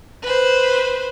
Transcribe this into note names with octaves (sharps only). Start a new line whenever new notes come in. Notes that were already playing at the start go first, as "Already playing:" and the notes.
B4 C5